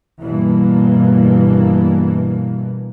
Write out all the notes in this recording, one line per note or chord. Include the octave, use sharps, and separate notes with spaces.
G2 B2 E3 A#3